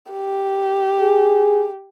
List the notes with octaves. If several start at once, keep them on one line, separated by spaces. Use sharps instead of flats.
G4
G#4